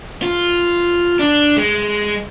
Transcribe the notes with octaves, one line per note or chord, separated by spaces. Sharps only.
F4
D4
G#3